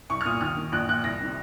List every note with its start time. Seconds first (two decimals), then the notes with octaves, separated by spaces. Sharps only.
0.09 C2 C#6
0.21 F6
0.25 A#2 D#6
0.41 D#2 F6
0.57 D#3
0.72 A#1 F#6
0.88 A#2 F#6
1.04 C2 A#6
1.20 C3 D#3